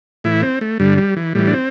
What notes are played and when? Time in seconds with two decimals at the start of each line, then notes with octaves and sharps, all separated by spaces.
0.24 A2 E3 E4
0.42 C4
0.61 A3
0.80 G2 D3 G3
0.98 G3
1.17 E3
1.35 A2 E3 G3
1.47 D4
1.53 C4